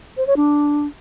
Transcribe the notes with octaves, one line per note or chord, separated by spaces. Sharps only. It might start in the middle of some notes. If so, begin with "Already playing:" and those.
C5
C#5
D4